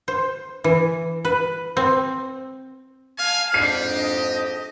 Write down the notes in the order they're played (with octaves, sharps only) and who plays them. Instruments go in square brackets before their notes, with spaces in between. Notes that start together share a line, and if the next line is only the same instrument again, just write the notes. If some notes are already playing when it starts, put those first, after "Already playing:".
[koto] C5
E3
B4
C4
[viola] F5 A5 [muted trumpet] G#5
[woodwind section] F2 G#2 D4 [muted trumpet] G4 [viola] D5 [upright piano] C7
[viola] D#5